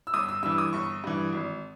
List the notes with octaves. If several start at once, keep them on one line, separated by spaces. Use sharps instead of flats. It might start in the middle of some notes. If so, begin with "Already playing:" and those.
E6
G1 D#6
E6
G2 E3 E6
D#6
G1 C#6
G2 E3
G#1